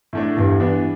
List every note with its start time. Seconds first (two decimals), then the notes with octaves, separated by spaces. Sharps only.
0.13 A2 A3 D4
0.37 E2 G2
0.60 E3 B3 D4